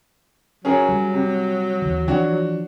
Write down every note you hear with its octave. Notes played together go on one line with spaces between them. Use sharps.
F#3 C#4 G#4 A#4
G3
C3
D#2 E3
E3 F3 D4 F#4 C#5